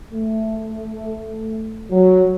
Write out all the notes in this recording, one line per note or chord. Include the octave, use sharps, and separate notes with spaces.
A3
F#3